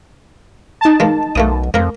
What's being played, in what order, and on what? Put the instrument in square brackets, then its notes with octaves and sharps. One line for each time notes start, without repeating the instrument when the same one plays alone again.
[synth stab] D#4 A5
[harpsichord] G#3 A#3
[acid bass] B1 [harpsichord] A3 A#3 D#6
[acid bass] F2 [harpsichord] A#3 A#4